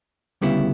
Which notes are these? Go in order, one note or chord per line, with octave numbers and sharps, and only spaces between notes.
D2 C#3 G3 B3 E4